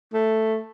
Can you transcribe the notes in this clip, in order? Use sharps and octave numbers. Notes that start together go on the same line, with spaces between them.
A3